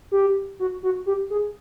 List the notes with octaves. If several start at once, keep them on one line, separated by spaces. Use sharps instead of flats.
G4
F#4
F#4
G4
G#4